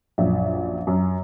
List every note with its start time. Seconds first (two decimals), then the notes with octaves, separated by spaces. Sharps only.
0.18 A#1 F#2 E5
0.87 F#2